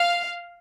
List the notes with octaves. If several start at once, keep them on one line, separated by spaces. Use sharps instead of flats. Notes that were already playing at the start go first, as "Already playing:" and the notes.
Already playing: F5